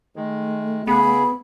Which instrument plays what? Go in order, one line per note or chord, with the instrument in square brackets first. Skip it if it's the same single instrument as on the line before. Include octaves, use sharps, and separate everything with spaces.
[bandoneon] D#3 G#3 [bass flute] A3
[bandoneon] C#3 G#4 [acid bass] B3 [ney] B5